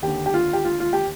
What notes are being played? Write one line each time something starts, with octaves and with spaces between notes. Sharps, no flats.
D#2 D3 G4
G4
F4
G4
F4
F4
G4